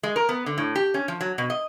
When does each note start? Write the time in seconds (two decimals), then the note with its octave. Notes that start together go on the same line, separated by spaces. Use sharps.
0.03 G#3
0.16 A#4
0.29 B3
0.46 D3
0.58 A2
0.76 G4
0.94 C#4
1.08 F3
1.21 F#3
1.38 B2
1.50 D#5